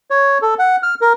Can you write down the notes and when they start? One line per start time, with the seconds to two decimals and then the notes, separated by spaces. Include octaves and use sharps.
0.10 C#5
0.42 A4
0.59 F#5
0.83 F6
1.01 A#4